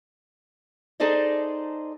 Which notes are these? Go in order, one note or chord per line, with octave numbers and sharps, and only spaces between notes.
D#4 G#4 A4 C5 D5 D#5